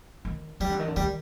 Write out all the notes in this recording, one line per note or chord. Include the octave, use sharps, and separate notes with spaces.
D#3
E3 G3
D3
D#3
D3
D#3 G3